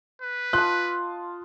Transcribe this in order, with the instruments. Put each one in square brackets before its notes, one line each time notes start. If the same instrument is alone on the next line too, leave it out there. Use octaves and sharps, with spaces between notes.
[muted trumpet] B4
[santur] F4 D#5 A5 [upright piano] F#6